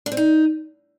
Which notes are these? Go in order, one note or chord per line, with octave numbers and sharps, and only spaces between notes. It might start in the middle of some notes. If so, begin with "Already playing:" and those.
D4
C4
D#4